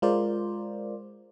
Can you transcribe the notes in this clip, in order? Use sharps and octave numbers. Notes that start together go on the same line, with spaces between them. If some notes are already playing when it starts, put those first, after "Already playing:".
G#3 F4 A#4 C5 D5